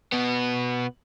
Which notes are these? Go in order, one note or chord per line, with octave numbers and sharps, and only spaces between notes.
B2 B3